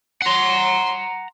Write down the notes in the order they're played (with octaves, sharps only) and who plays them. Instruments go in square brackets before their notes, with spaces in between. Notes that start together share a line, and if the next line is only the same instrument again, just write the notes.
[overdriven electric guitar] F#5 A#5 [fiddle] C6